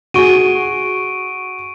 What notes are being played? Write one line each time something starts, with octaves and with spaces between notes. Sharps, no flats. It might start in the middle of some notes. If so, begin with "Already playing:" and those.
F#4 G#4 C#6 D7 D#7